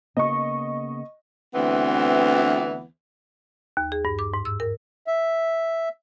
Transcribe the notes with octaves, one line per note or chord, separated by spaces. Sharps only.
C#3 A#3 B3 D#5 C#6
D2 E3 B3 C4
D#2
G#4
G2
D6
G#2
E6
A#4
E5